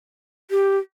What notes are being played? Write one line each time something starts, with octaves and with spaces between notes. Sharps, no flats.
G4